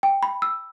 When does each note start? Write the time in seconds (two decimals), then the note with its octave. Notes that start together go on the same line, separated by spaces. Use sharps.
0.03 G5
0.23 B5
0.42 E6